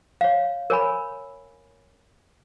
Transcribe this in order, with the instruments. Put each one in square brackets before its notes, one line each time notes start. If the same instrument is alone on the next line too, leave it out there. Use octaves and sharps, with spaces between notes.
[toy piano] C#5 F5
A#4 C#5 G#5 B5